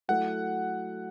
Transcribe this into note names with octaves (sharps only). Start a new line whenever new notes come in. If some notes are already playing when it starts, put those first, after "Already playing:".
F#3 A3 E4 A4 F#5